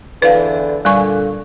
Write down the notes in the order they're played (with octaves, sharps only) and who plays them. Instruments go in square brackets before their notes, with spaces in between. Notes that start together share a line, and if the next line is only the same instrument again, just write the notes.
[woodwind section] E2 D3 E3 [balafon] B4 F5
[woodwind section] A#2 D3 [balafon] G3 G#5 C#6